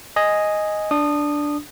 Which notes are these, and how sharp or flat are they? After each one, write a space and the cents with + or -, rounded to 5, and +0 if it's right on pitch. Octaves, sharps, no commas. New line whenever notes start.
D#5 +0 G#5 +0
D4 +0 D#6 -20